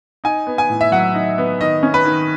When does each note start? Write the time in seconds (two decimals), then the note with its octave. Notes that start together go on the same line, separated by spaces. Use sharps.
0.24 D#4 G#5
0.47 B3
0.58 G#5
0.70 A2
0.81 E5
0.92 F#3 F#5
1.14 D#4
1.38 B3
1.61 D#3 D#5
1.83 C#4
1.94 B4
2.05 D#3